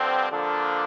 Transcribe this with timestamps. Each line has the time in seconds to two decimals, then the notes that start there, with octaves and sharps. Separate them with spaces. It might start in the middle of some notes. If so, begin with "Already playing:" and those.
Already playing: G2 D3 F3 C4
0.30 D3 F3 A#3 D4 A4